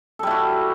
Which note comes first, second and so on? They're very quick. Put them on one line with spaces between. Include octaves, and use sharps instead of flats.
A4 G3 E4 F#4